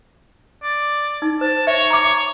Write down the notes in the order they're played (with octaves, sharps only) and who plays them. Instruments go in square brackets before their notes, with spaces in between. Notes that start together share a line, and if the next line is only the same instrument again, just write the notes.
[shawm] D5
[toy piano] D#4
[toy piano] C5 [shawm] A5
[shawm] C#5 [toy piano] E5
[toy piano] A#5 D6